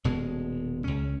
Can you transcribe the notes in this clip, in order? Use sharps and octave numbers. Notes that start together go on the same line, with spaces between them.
D#1 B2 G#3
C#2 C#4